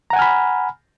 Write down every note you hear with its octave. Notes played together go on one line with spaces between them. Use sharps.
F#5 G#5 A#5 B5 F6